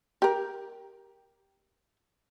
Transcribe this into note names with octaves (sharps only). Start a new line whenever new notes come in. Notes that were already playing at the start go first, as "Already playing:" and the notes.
G4 A#4